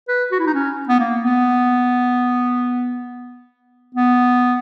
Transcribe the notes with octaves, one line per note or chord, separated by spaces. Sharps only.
B4
F#4
E4
D#4
C#4
B3
A#3
B3
B3